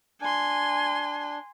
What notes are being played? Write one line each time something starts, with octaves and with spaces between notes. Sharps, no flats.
D4 G#5 C6